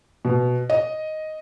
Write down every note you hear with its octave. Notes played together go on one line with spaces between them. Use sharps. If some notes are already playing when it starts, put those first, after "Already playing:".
B2
D#5